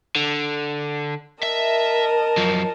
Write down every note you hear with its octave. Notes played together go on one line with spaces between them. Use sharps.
D3
A#4 D#5 E5 A5
F#2 F3